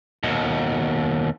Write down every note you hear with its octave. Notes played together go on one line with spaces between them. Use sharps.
D#2 B2